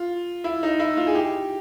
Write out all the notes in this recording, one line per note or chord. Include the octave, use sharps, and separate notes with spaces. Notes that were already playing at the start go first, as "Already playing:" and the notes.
Already playing: F4
E4
D#4
E4
F4
G#4
G4